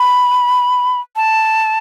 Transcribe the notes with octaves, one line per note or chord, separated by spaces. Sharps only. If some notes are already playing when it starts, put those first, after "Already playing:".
Already playing: B5
A5